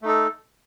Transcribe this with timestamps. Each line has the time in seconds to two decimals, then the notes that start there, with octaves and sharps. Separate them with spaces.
0.02 A3
0.05 D#4
0.08 A4